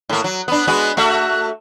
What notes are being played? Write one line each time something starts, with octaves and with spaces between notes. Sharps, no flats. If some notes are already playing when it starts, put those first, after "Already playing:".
A2 A#3
F#3
B3 D4
G#3 B3 F#4
A3 F#4 E5